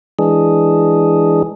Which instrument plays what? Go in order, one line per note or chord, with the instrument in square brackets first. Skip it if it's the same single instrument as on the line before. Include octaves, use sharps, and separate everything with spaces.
[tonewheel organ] E3 G#3 D4 G#4